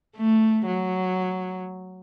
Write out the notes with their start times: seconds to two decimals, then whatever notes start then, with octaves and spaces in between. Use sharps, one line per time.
0.16 A3
0.66 F#3